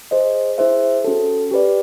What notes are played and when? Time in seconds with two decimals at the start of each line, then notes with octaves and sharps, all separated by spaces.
0.11 G#4 C5 D#5
0.58 E4 G#4 C5 E5
1.04 C#4 F#4 A4
1.51 G4 B4 D5